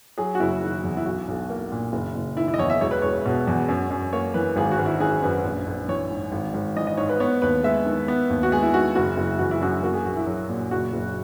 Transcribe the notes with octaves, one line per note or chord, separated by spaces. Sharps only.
F#3 G#4
F#4
F#1 E4
D#3
E2
E4
B1 F#4
B1
A#3
A#2
F#1
F#1
D#3 E4
E4
D#5
E2 C#5
E5
E1 C#5
B4
E1 C#5
B2
E2
F#2
F#2
A#3 C#5
E3 B4
G#1 G#4
F#4
G#1
E4
D#3 G#4
F#2 B4
A#1
A#1
E3 C#5
G#2
G#1
G#1
E3 D#5
D#5
G#2 C#5
B4
B3 C#5
D#2 B4
G#3 E5
D#3
B3
D#2
F#4
G#3 G#4
E4
D#3 F#4
F#1 F#4
F#1 E4
E3 F#4
E4
F#2 F#4
A#3 F#4
G#4
A#1 F#4
E4
F#3
A#2
F#1 F#4
F#1